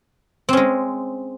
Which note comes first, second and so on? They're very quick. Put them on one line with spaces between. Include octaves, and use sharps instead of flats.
C4 C#4 G#3